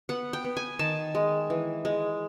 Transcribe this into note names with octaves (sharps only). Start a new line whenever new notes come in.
B3 F#5
G5
B3
G#5
D#3 A5
G#3
E3
G#3